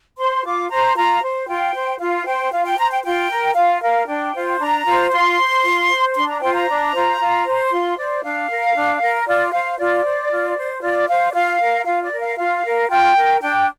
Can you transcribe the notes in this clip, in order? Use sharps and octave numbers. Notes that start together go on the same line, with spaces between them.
C5 C6
F4 D6
C5 A#5
F4 A#5
C5
F4 G5
C5
F4 F5
C5 G5
F4 F5
G5
C5 A#5
G5
F4 G5
A#4
F4 F5
A#4 F5
D4 G5
F4 C5
D4 A#5
F4 C5
F4 C6
C5
F4
C5
D4 C6
A#5
F4 C5 G5
A#5
D4
F4 C5
F4
C5
F4 C6
C5 D5
D4 F5
A#4
D4
A#4
F4 D5
C5 F5
F4 D5
C5
F4
C5
F4 D5
C5 F5
D5
F4 F5
A#4
F4 F5
D5
A#4
F5
F4 F5
A#4
F4 G5
A#4
D4 G5